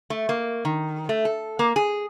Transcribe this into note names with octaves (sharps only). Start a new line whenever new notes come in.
A3
A#3
D#3
A3
A4
A#3
G#4